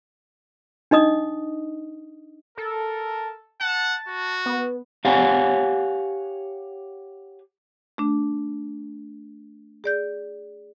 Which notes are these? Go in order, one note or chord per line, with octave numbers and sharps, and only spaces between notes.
D4 D#4 D#5 D#6
A4 A#4
F#5 A5
F#4
B3
G4 C#5 F5 F#5 G#5
A3 D4
G#4 D5 G6